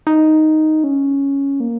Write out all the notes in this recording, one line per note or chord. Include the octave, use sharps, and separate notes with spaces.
D#4
C#4
A#3